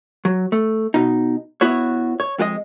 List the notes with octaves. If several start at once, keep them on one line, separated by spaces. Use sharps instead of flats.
F#3
A3
B2 D#4
B3 E4 F#4 C#5
C#5
F2 G#3 G4 D#5